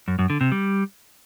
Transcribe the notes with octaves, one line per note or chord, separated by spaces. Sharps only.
F#2
F#2
D3
C3
G3